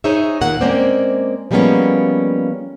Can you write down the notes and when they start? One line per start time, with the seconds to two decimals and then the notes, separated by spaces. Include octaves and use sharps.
0.04 D#4 G#4 C5 C#5 E5
0.41 D#2 A#2 A#3 F#5
0.61 G#3 A#3 C4 C#4 C5 D5
1.51 F3 G3 G#3 A#3 B3 C#4